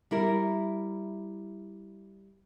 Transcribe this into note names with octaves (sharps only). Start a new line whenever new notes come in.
G3 E4 A#4